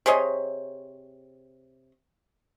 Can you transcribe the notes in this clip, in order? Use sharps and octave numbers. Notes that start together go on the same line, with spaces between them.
C3 G#4 C#5 D#5